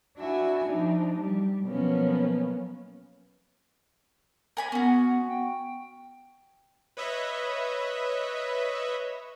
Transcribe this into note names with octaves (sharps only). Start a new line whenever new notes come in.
D4 E4 F#4 E5 G#5
F3 D4 D#4
G3
B2 F3 F#3 A#3 B3 C#4
A#4 G#5 B5
B3 C#4 F#4
G5
B4 C#5 D#5 E5 B5